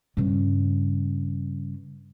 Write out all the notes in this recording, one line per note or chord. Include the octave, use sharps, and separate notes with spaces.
G2 C#3